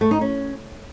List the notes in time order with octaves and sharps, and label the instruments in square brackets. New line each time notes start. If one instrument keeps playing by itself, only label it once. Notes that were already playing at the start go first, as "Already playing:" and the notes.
[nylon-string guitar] A3
D#4
C#4